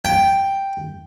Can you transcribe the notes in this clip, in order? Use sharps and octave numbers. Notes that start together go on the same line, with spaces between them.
G5